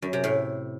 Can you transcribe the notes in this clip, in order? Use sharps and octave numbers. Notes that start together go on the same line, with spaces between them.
F#2
C3
A2